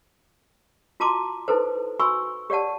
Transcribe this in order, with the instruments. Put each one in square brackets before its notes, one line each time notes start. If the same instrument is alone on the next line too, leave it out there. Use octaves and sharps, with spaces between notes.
[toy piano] F4 F#4 A5 A#5 C6 D6
D#4 E4 A4 B4 C5
F#4 G#5 B5 C#6 E6
G4 C#5 D5 F#5 A5